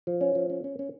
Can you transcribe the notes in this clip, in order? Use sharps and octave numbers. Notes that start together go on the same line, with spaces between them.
F3
C#4
F3
C#4
C#4
C#4